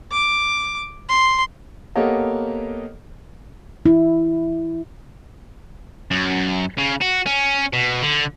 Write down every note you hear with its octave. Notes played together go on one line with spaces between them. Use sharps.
D6
C6
A#3 B3 G4 A4 C#5 D#5
E4
F#2
C#3
F#4
C#4
B2
D3